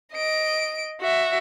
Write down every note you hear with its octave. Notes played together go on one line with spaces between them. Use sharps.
D#5 D7
F#4 E5